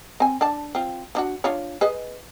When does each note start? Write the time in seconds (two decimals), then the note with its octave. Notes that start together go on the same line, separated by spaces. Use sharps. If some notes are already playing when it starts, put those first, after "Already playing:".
0.20 C4 G#5
0.41 D4 D5 A5
0.75 C4 F4
1.15 F3 D4 F#4
1.44 D4 F4 C#5
1.81 G#4 B4 D#5